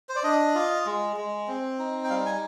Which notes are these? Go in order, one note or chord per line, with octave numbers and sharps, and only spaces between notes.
C5
D5
D4 D#5
F4
G#3
G#3
C4
D#4
G5
G3 F5
G#5